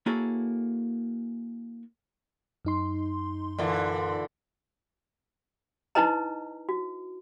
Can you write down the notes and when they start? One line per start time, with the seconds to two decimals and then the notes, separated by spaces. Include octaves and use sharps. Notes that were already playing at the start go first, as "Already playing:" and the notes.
0.06 A#3 E4 F#4 G#4 A4 C#5
2.65 F#2 D#4 C6
3.58 A#2 D3 E3
5.95 D#4 E4 B4 C5 D#5 A#5
6.69 F#4